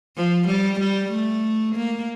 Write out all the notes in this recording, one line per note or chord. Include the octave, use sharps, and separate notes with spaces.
F3
G3
G3
A3
A#3